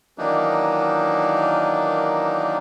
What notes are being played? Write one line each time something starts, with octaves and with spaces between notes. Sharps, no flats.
D#3 E3 F#3 A#3 D4 D#4